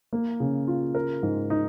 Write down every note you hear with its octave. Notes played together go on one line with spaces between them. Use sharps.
A#3
C#3
F4
A#4
G#2
D#4